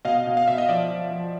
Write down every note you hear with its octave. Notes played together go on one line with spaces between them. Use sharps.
B2 D#5 F5
B2
F5
B2 E5
D#5
F3 D5 E5
F3
F3